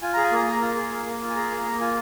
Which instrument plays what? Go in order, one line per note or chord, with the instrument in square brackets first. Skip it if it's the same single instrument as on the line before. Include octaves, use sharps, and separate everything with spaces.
[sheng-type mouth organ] F4 G#5
G#4 A#5
G#5
A#3 A#5
A#3 A#5
F4
G#4
A#3
A#3
F4
G#5
G#4 A#5
A#3
A#3
F4 G#5